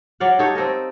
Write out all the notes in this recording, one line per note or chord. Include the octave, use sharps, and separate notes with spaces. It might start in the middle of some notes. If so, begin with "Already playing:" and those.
F#3 D5 F5 F#5
D#4 G4 A4 C#5
C4 A4 A#4 D#5